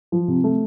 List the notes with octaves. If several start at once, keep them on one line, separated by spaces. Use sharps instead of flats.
F3
C3
A3